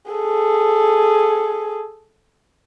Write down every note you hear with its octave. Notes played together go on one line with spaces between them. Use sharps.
G#4 A4